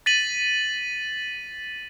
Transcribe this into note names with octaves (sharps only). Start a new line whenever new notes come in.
A6 B6 D#7 F#7